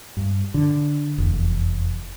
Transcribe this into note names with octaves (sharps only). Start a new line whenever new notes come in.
G2
D3
F1 E2